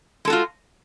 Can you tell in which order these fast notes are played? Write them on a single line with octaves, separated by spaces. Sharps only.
G#3 A4 F#4 F4